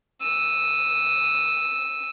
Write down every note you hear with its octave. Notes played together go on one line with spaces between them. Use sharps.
E6 D#7